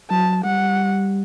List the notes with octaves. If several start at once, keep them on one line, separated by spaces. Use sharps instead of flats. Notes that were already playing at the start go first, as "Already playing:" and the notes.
F#3 A5
G3 F#5